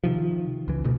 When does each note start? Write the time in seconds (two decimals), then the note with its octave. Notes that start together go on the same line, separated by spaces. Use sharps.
0.04 C3 D#3 F3
0.68 C#2 E3
0.84 E1 D2 B2